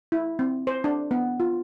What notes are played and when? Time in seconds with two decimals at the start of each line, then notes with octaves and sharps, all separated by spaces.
0.12 E4
0.39 C4
0.67 C5
0.84 D4
1.11 B3
1.40 F4